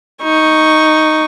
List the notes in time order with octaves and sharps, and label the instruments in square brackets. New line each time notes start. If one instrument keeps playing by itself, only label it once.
[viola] D#4 C#6